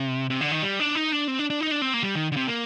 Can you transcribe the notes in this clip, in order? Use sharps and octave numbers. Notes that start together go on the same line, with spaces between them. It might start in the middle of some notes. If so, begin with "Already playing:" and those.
Already playing: C3
C3
D3
D#3
G3
D4
D#4
D4
C4
D4
D4
D#4
D4
C4
A#3
G3
D#3
D3
C3
A#3